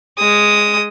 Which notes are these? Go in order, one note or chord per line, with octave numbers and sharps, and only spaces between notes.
G#3 D#6